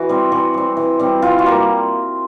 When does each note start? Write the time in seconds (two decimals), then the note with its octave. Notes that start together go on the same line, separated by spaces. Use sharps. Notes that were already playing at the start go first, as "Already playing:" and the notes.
Already playing: E3 F#4
0.09 G3 C4
0.32 E3 F#4
0.54 G3 C4
0.77 E3
0.99 G3 C4
1.22 E3 F4
1.39 F#4
1.46 G3 A#3